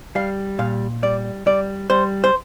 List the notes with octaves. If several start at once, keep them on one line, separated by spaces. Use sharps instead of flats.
G3 F5
A#2 F5
G3 D5
G3 D5
G3 C5
C5